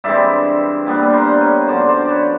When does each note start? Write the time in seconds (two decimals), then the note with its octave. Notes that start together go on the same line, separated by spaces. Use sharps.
0.04 G2 E3 G#3 C4 D5 E5
0.86 A#2 G3 B3 D4
1.03 B4
1.13 A#4 C5
1.41 B4 C#5
1.67 F#2 D3 F3 C5 D5
1.88 C5 D5
2.09 B4 C#5